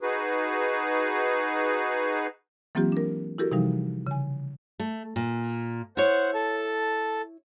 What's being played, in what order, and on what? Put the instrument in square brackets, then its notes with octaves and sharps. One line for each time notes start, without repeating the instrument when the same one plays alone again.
[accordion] D#4 F#4 G#4 B4
[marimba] E3 F#3 A#3 C4 F4 G4
D4 A#4
E4 F#4 G4 A4 A#4
C3 E3 F3 G3 D#4
C#3 G#5
[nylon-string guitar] A3
A#2
[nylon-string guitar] E4 C#5 [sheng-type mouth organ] C5 F#5
[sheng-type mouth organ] A4 A5